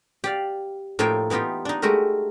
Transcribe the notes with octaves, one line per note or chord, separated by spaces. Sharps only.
G4 D5 F5
A2 F3 A#3 D#4 C#5 G5
E3 B3 D#4 F4 G4
D4 D#4
G#3 A3 F#4 G4 A#4